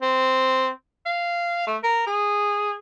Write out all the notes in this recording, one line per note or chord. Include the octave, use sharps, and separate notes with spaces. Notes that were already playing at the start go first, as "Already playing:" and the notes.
C4
F5
A3
A#4
G#4